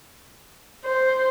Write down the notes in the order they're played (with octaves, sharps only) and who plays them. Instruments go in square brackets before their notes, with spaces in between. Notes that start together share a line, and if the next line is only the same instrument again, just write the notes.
[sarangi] C5